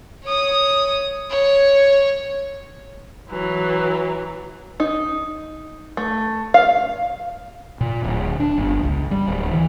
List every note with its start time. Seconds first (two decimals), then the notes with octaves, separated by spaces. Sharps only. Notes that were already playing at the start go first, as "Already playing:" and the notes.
0.24 C#5 D#6
1.30 C#5
3.30 E3 F#3
4.80 D#4
5.97 A3
6.54 F5
7.81 A#2
8.04 D1
8.40 D4
8.57 G1
8.83 C#2
9.11 G3
9.28 D1
9.51 E3